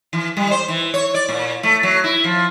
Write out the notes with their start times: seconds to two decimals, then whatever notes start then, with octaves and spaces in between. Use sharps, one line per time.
0.13 E3
0.37 G3
0.51 C5
0.68 E3
0.94 C#5
1.14 D5
1.29 A#2
1.63 A3
1.83 F#3
2.04 E4
2.24 F3